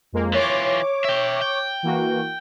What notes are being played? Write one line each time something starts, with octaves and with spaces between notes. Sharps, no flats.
F2 G#3 A#3
E3 F4 C#5 D6
E5 G5
G5
E3 A#3 F#4